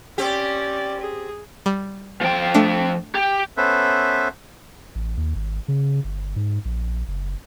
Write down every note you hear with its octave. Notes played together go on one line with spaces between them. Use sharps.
C4 C#4 G4 D5
G#4
G3
F3 G5
A3 D4
G4
B3 C#4 A4 B4 C5 E5
A1
D#2
G#1
C#3
G1
G#2
A#1
F#1